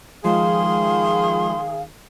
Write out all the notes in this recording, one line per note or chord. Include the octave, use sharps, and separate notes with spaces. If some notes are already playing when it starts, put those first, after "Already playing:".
D#3 F3 G#3 G#4 F5 C6